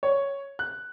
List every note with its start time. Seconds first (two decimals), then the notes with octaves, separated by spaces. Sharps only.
0.03 C#5
0.59 F#6